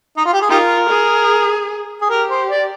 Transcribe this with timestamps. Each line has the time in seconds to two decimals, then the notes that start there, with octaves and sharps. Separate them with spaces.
0.17 D#4
0.25 F4
0.33 G4
0.41 G#4
0.49 D#4 F4 G4 A#4
0.89 G#4
2.01 G#4
2.09 G4 A#4
2.30 C5
2.49 D5